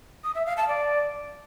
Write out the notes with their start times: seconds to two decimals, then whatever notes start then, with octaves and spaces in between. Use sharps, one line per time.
0.24 D#6
0.35 E5
0.46 F5
0.57 A5
0.68 D5